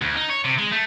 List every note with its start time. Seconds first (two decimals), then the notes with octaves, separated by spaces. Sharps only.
0.02 D2
0.16 D#4
0.29 C#5
0.44 C3
0.58 G#3
0.72 A3